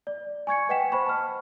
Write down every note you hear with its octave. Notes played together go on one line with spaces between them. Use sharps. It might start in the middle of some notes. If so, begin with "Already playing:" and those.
D5
G#5 C#6 G#6 C#7
B4 D#5 F#5 G5 B6 E7
C5 B5 C#6
A5 F6